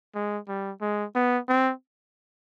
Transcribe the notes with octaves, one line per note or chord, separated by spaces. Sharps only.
G#3
G3
G#3
B3
C4